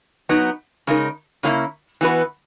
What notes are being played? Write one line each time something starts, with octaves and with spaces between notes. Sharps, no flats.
F#3 B3 D#4
C#3 G#3 D#4 A#4
C#3 F#3 A#3 C#4 E4
E3 B3 F#4 B4